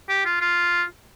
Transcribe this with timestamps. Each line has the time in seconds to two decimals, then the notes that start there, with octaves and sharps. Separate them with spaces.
0.09 G4
0.25 F4
0.41 F4